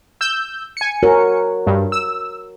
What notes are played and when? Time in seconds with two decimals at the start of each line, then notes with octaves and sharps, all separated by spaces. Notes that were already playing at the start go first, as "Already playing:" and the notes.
0.21 E6 G6
0.77 G#5 C#7
1.03 F#4 A#4 C#5
1.67 G2
1.92 E6